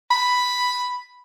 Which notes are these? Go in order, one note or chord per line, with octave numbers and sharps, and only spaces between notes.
B5